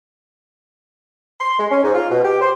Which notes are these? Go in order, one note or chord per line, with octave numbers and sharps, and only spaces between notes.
C6
G#3
C#4
G#2
F4
B2
G4
C5